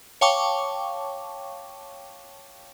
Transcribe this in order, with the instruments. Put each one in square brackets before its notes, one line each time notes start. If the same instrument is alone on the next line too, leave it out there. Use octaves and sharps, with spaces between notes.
[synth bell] C#5 F5 G5 A5 C#6 D6